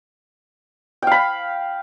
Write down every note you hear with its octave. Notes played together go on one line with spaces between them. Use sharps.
F5 G5 B5